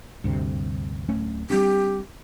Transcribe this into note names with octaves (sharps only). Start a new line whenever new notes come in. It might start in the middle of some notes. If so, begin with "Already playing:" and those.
D2 G2 C3
D1 A3 C#4
G3 C4 D4 G4